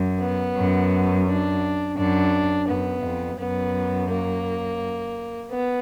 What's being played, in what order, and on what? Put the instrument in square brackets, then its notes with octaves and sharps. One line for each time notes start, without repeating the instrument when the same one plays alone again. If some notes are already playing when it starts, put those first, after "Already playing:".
Already playing: [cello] F#2
[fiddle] B3
[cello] F#2
[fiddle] D4
[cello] F#2 [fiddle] D4
[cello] F#2 [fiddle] B3
[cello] F2
[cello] F#2 [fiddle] B3
[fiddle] A#3
B3